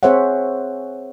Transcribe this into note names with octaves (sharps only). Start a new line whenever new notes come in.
C4 G#4 C5 C#5 E5 F#5